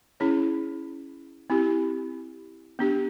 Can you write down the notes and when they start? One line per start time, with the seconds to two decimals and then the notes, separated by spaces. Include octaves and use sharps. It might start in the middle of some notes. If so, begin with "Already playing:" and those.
0.20 C#4 E4 G#4 C#5
1.50 C4 E4 G4
2.79 B3 D4 G4